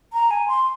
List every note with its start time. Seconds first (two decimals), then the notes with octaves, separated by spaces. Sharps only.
0.13 A#5
0.31 G#5
0.48 C6